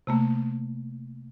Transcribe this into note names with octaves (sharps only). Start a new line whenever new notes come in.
C3 A3 A#3